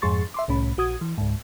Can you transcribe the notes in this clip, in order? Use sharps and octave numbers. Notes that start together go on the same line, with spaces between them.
F2 G#2 G#4 C6 C#6 A6
E5 C6 D6
C2 A2 C#4 B5
A#1 F#4 D#6 G#6
E3
C#2 G#2